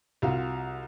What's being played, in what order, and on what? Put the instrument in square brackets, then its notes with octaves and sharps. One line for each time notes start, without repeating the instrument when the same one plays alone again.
[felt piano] C2 F4 F#4